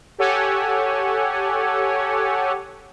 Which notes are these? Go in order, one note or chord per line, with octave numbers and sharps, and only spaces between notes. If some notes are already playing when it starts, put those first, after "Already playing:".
G4 A4 C#5 F#5 G#5